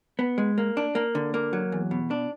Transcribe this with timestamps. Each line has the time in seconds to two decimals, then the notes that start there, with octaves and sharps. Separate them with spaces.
0.19 B3
0.38 G#3
0.58 A#3
0.77 D4
0.95 A#3
1.15 D3
1.34 A#3
1.53 F#3
1.72 E2
1.91 B2
2.11 D4